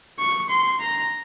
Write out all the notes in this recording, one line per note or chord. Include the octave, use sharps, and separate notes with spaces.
C#6
C6
A#5